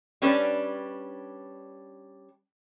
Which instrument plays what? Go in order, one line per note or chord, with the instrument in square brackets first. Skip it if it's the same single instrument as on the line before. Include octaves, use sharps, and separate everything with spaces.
[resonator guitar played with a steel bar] G3 C#4 D4 B4 D5